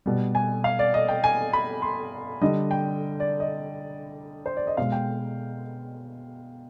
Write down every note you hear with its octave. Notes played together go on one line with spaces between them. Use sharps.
B2 G3
G#5
F5
D5
D#5
G5
G#5
B5
C6
D3 G3 D#5
G5
D5
D#5
C5
D5
D#5
B2 G#3 F5
G5